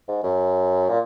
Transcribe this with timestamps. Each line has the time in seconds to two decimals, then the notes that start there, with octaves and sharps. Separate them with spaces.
0.08 G#2
0.23 F#2
0.89 A#2